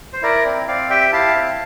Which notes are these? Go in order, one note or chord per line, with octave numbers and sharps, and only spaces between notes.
C5
E4 A#4 D5
C4
C4 D5 F5
G4 E5 G5
E4 F5 A5
C4